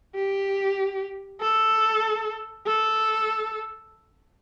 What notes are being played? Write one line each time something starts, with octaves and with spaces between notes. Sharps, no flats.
G4
A4
A4